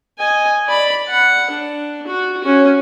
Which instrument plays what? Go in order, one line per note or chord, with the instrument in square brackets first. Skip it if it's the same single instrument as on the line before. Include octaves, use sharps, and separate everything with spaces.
[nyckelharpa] D#5 G#5
D5 B5
F#5
D4
F#4
C#4 F#4